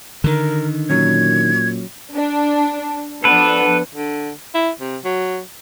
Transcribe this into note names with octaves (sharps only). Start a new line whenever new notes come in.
D3 D#3 A#4
A#2 F#3 C#4 G#6
D4
F3 B3 D4 A4 B4
D3
E4
C3
F#3